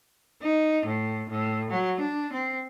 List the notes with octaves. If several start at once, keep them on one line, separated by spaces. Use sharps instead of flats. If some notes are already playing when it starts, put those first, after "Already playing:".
D#4
A2
A2
F#3
D4
C4